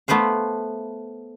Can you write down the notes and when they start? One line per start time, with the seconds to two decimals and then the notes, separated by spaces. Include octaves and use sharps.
0.08 A3 B3 B4 C5 F5